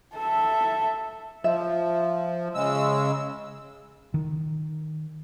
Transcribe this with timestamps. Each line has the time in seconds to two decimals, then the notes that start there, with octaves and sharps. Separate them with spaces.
0.16 A4 E5
1.44 F3 E5
2.54 C#3 G#3 E6
4.14 D#3